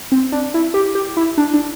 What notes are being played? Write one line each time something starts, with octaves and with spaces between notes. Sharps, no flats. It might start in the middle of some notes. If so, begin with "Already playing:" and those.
C4
D4
E4
G4
G4
E4
D4
D4